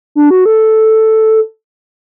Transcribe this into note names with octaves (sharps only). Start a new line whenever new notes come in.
D4
F#4
A4